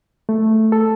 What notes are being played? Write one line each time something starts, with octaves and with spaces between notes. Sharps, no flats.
A3
A4